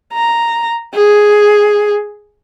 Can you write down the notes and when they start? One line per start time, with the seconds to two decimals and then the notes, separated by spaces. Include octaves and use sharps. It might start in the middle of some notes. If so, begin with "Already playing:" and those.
0.13 A#5
0.95 G#4